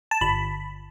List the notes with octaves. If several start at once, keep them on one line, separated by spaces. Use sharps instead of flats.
A5
G1 B5